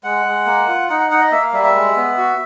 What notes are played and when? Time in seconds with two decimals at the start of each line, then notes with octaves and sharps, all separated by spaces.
0.04 G#3 F#5
0.25 G#3
0.46 A#3
0.68 F4
0.89 D#4 F#5
1.00 F#5
1.10 D#4 F#5
1.21 D#5
1.31 A#3 E5
1.42 F5
1.53 G3 E5
1.63 E5
1.75 G#3
1.96 B3
2.17 F#4